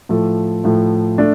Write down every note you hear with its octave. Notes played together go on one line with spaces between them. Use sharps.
A2 F3 A3
A2 F3 A3
A3 D4